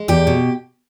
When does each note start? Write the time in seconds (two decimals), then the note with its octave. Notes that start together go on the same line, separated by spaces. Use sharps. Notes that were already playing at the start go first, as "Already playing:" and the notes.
Already playing: G#3
0.08 E2 G4
0.27 B2